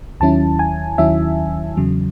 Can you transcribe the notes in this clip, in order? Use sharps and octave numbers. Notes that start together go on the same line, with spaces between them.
D#2 D#3 F#3 C#4 E4 A5
G#5
D#2 D#3 F#3 C#4 E4 E5
E2 C#3 F#3